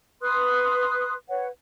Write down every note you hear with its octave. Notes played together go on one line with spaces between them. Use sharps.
B4 C6 D#6 F#6
B4 C#5 F#5